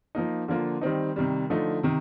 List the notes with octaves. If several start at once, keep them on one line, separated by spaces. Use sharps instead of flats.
F3 A#3 D#4
D3 F3 A#3 F4
D#3 G3 C4 D#4
C3 D#3 G3
D3 F3 A3 D#4
C3 D#3